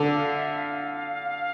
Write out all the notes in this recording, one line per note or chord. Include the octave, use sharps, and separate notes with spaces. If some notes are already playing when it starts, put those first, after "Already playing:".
Already playing: D3
F5
E5
F5